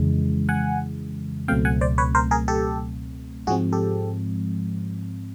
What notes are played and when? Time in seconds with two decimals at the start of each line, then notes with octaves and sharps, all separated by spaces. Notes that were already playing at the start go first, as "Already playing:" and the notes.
Already playing: F2 C#3 E3 G#3
0.49 F#5 G#5
1.48 C#2 B2 F#3 A3 C4 F5 G5
1.65 F#5 G#5
1.81 C5 D5
1.98 B4 C#5
2.15 A#4 C5
2.31 G#4 A#4
2.48 G4 A4
3.47 G#2 F3 G#3 C4 F#4 G#4
3.73 G4 A4